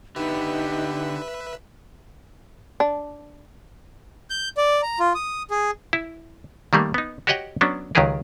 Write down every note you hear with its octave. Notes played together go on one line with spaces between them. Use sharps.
D3 B3 D#4 G4 B4 E5
D4
G6
D5
A#5
F4
D#6
G#4
E4
D#3 G3 A3 A#3
B3 D#4
F#4 G4 C#5 D#5 F#5 G5
F#3 B3 C#4 D4
C#2 D#3 F#3 G4 G#4 A#4